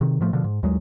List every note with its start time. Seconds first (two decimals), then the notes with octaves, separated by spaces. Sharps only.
0.01 C3 D#3
0.21 A2 F3 A3
0.33 B2 D3 F3
0.44 G#2
0.63 D#2 F#3 G#3